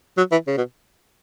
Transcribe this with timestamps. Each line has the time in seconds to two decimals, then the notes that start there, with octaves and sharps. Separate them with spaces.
0.17 F#3
0.32 E3
0.47 C#3
0.57 B2